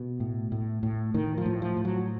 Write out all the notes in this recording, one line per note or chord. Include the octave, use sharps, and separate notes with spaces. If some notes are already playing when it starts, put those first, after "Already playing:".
Already playing: B2
A2
A2
A2
A2 D#3
F3
A2
F3
A2
F#3